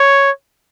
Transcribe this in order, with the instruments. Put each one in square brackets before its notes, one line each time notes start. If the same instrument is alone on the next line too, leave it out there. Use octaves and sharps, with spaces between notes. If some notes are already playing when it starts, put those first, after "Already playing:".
Already playing: [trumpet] C#5